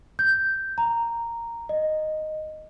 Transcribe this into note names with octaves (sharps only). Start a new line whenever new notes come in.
G6
A#5
D#5